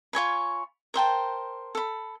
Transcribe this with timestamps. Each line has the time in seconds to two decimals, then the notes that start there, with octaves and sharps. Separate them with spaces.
0.13 F4 C#5 G#5 B5
0.94 A#4 C5 G5 A5
1.75 A4 B5